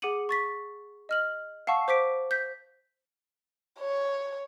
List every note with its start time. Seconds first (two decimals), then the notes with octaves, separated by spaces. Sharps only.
0.02 G#4 F#5 D6 C#7 D#7 F#7
0.29 C#6 A6 B6
1.09 D#5 F6 F#7
1.67 F5 F#5 A5 C#6 E6 C7
1.88 C5 D6 B6 D7
2.31 G6 B6
3.80 C#5